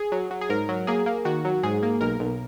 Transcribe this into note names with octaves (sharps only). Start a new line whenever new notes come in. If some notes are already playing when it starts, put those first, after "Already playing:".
Already playing: G#4
F#3
F#3
G#4
G#2 A#4
F#3
A#3 G#4
A#3
D#3 F#4
F#3
G#2 G#4
A#3
B1 A#4
B1